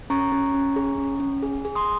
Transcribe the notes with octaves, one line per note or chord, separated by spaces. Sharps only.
C#4 A#5 C#6
C#4
C#4
G#4
C#4
C#4
G#4
G#4
C6 D#6